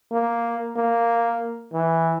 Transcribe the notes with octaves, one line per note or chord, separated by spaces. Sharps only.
A#3
A#3
E3